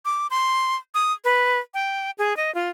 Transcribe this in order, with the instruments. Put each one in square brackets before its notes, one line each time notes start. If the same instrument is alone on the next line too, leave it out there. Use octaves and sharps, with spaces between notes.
[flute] D6
C6
D#6
B4
G5
G#4
D#5
F4